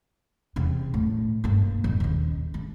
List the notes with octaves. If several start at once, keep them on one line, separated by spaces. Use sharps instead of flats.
E2 C3
A2
G2 A#3
F2 A#2
D#2 C#3
D4